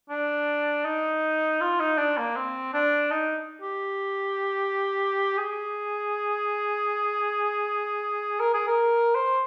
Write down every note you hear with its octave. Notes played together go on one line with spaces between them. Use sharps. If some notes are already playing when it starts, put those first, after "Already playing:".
D4
D#4
F4
D#4
D4
A#3
C4
D4
D#4
G4
G#4
A#4
G#4
A#4
C5